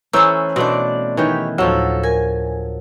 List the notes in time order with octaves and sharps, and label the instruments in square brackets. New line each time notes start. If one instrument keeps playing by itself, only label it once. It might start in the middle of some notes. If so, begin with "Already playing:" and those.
[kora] E3 C#4 C5 [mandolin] A3 E6 [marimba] A#5
[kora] B2 A3 [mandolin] C4 D4 D5
[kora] D#3 E3 [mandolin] G4 C#5
[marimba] D2 A2 C#6 [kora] F3 F#3 [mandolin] A4
[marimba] A#4 [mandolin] G#5